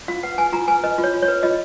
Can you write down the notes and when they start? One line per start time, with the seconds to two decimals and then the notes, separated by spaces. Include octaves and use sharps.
0.08 F4 F5
0.23 B4 F#5
0.38 B4 G#5
0.52 F4 A#5
0.68 B4 G#5
0.84 B4 D#5
0.98 F4
1.03 C#5
1.14 F4
1.22 C#5
1.28 B4
1.43 F4 D#5